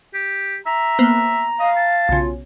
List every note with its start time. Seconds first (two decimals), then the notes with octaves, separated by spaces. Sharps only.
0.14 G4
0.66 E5 A#5
0.99 A#3 B3 C5
1.60 D#5 F5
1.76 A5
2.09 B1 C#3 F4